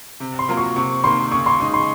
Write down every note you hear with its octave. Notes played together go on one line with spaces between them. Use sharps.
C3
C6
F#3 A#3 F4 A#4
C#6
C3 C#6
D#3 A#3 C6
C#3 C#6
C6
G#3 D#4 C#6
C6